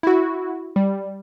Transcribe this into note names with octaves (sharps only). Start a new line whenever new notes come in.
E4 F#4
G3